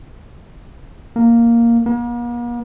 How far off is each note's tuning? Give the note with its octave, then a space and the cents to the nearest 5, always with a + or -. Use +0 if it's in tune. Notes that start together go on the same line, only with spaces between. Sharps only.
A#3 +0
A#3 +45